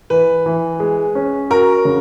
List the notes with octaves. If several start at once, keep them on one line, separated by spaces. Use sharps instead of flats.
E3 B4
E3
G#3
C#4
F#4 A#4
C#3